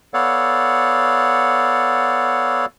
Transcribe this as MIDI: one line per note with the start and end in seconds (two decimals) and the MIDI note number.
0.14 2.66 59
0.14 2.66 69
0.14 2.66 73
0.14 2.66 74
0.14 2.66 77
0.14 2.66 78